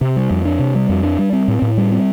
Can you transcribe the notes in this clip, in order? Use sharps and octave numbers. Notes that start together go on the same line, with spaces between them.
C3
G3
F2
D4
C3
G3
F2
D4
G3
C4
A2
A2
G3
C4